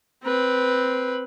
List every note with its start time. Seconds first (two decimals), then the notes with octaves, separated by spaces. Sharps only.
0.23 C4 B4